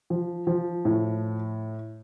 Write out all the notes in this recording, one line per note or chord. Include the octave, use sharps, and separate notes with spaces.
F3
F3
A2